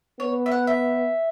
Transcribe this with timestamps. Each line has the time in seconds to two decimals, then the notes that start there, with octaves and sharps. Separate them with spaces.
0.20 B3 C#5
0.46 E5
0.51 F#5
0.67 E5